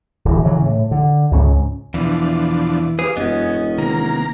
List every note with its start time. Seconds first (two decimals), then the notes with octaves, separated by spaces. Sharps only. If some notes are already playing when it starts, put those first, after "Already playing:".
0.25 D1 E3
0.45 C#3 E3 F#3
0.66 A2
0.91 D3
1.31 C#2 G#2 C#4
1.94 E2 B2 E3 F3 D4
2.99 G4 G#4 B4 F5 D6
3.17 E1 F#2 B3 C#4 D#5
3.78 C3 D#3 A#3 A#5